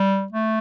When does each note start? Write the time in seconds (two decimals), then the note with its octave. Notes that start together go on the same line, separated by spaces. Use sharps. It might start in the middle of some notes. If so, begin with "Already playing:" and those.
Already playing: G3
0.33 A3